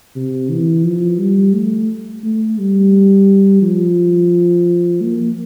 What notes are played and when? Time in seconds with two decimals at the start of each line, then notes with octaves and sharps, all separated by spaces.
0.16 C3
0.49 E3
0.84 F3
1.19 G3
1.54 A3
2.24 A3
2.58 G3
3.62 F3
5.02 A#3